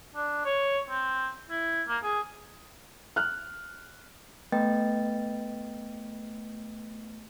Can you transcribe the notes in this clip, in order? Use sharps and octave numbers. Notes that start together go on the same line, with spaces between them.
D4
C#5
C4
E4
A#3
G#4
F6 F#6
A3 B3 B4 D#5 G5 A6